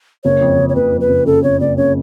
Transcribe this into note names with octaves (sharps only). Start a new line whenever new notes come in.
F#1 C#5
F2
F#1
C#5
F#1 B4
F2
B4
F#1
C#3 A4
F#1 C#5
F#1 D5
C#3 C#5